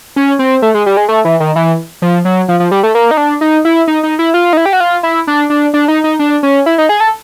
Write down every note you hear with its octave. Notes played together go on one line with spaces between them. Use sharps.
C#4
C4
A3
G#3
G3
G#3
A3
E3
D#3
E3
F3
F#3
F3
F3
G3
A3
A#3
D#4
D4
D#4
E4
D#4
D#4
E4
F4
D#4
E4
G4
F#4
F4
E4
D4
D4
D4
D#4
D#4
D4
C#4
E4
D#4
G#4
A4